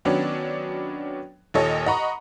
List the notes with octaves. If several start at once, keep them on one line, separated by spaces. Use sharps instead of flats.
D#3 F#3 B3 C#4 D4
D#2 A#2 A4 C#5 D#5
D#5 F#5 A#5 B5 C#6